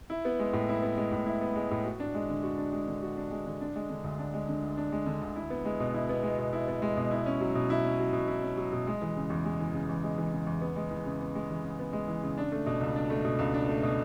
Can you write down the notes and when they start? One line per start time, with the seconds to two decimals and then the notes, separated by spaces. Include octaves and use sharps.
0.10 E4
0.25 B3
0.39 G#3
0.53 A2
0.69 E4
0.82 B3
0.97 G#3
1.12 A2
1.26 E4
1.41 B3
1.56 G#3
1.71 A2
1.85 F#4
2.00 D4
2.15 G#3
2.30 D3
2.43 F#4
2.58 D4
2.73 G#3
2.88 D3
3.02 F#4
3.17 D4
3.31 G#3
3.46 D3
3.61 D4
3.76 G#3
3.90 D3
4.04 D2
4.19 D4
4.34 G#3
4.49 D3
4.63 D2
4.77 D4
4.92 G#3
5.06 D3
5.22 D2
5.36 E4
5.50 B3
5.65 G#3
5.80 B2
5.94 E4
6.09 B3
6.23 G#3
6.39 B2
6.53 E4
6.68 B3
6.82 G#3
6.97 B2
7.11 E4
7.26 C#4
7.41 F#3
7.55 B2
7.70 E4
7.85 C#4
7.99 F#3
8.13 B2
8.28 E4
8.43 C#4
8.58 F#3
8.73 B2
8.87 G#3
9.02 E3
9.16 C#3
9.30 E2
9.45 G#3
9.60 E3
9.74 C#3
9.89 E2
10.03 G#3
10.18 E3
10.33 C#3
10.47 E2
10.61 B3
10.76 G#3
10.91 E3
11.06 C#3
11.20 B3
11.35 G#3
11.50 E3
11.64 C#3
11.79 B3
11.93 G#3
12.08 E3
12.23 C#3
12.38 D4
12.52 A3
12.66 B2
12.81 C#2
12.96 D4
13.10 A3
13.25 B2
13.39 C#2
13.54 D4
13.68 A3
13.83 B2